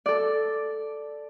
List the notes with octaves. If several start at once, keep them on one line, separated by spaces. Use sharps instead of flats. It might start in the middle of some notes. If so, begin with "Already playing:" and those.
A4 D5